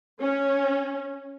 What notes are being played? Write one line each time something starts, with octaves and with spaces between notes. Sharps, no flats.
C#4